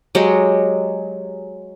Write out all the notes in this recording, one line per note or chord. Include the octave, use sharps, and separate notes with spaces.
F#3 G#3 G4